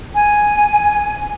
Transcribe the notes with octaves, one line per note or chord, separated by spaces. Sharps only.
G#5